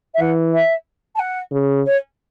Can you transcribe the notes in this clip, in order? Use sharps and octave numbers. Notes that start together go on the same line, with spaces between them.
E5
E3 F#5
E5
A5
F#5
C#3
C#5